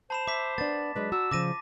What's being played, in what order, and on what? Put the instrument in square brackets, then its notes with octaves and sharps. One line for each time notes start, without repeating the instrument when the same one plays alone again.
[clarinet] C5 [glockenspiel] A5 B5 E7
[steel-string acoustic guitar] E5 [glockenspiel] D6 B6
[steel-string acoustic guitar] B3 D4 [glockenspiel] A6
[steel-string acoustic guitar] F#3 G#3 D4 [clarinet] B4
[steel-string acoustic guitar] F#4 A#5 [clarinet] E6
[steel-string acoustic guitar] C#3 F3 [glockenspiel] D6 A#6 D#7